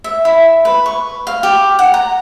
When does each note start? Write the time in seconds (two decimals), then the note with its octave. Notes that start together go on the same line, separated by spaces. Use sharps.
0.04 E5
0.25 E4
0.65 B4
0.86 C#6
1.27 F5
1.43 G4
1.79 F#5
1.94 A#5